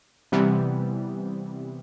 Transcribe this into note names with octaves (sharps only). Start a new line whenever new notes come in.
C3 E3 G3 B3